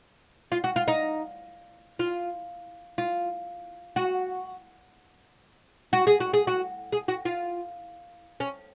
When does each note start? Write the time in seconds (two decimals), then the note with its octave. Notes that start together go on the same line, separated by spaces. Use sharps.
0.52 F4
0.64 F#4
0.76 F4
0.88 D#4
1.99 F4
2.98 F4
3.96 F#4
5.93 F#4
6.07 G#4
6.20 F#4
6.33 G#4
6.47 F#4
6.92 G#4
7.08 F#4
7.25 F4
8.40 C#4